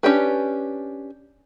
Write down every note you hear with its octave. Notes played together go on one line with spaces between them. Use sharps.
C#4 D4 G4 B4